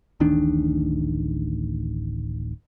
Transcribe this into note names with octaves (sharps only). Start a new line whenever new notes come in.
D1 A1 D#3 D4